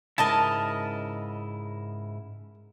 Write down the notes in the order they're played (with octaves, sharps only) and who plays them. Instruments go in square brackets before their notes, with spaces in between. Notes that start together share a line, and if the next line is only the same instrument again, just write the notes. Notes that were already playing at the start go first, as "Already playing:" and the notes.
[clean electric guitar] G#2 C#3 E4 [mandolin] A#4 D#5 A5